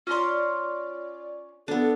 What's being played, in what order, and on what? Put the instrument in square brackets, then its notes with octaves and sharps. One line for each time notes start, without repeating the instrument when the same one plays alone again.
[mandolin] C#4 A#5 C6 [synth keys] F4 C#5 D5
[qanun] B3 D4 [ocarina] A4